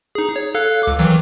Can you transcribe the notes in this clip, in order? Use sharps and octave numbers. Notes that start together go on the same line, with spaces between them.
D#4 G#4
C#5
A4 F5 F#6
C#2 D6
D#3 E3 F#3